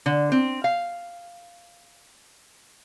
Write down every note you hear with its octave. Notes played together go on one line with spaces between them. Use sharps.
D3
C4
F5